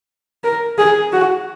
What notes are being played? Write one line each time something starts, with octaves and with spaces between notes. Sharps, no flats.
A#4
G#4
F#4